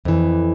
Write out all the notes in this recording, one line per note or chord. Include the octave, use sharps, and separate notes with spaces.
F2 E3